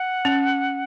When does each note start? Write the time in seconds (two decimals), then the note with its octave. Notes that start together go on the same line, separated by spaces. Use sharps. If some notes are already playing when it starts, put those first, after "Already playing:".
Already playing: F#5
0.25 C#4